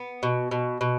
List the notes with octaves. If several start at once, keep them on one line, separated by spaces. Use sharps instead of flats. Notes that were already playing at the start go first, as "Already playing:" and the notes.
Already playing: B3
B2
B2
B2